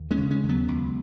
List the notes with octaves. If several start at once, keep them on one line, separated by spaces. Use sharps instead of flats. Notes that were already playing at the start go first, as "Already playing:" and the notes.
Already playing: D#2
G#3 C#4
C#3
G#3 C#4
D#2
F#3 B3
C#2